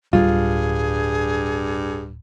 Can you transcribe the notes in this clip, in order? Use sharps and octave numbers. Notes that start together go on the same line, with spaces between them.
D1 G2 G3 F4 G#4